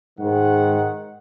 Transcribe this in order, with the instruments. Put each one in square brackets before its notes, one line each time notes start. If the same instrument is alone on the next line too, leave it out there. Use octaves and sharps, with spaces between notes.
[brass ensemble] G#2 D#3 G#3 F#5